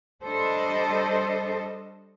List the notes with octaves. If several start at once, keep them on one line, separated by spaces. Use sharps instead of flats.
G3 D4 A4 C5 D#5